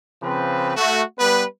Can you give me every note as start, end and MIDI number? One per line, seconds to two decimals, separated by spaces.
0.23 0.76 49
0.23 0.76 53
0.23 0.76 60
0.23 0.76 71
0.77 1.03 57
0.77 1.03 66
1.19 1.45 55
1.19 1.45 59
1.19 1.45 71